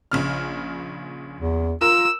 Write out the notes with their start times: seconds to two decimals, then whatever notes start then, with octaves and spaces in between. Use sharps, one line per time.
0.11 A#1 C#3 F6
1.41 E2
1.81 F4 A#4 E6